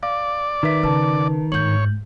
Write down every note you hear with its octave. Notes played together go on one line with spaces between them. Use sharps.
D5 F5
D#3 B4 E5 B6
C#3 B4 A5
G1 G#2 C#5 G6 F#7